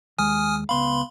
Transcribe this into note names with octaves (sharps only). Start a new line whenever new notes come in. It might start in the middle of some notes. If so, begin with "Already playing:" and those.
D#2 G#3 G#5 D#6 F6
C#2 B3 F5 B5 C6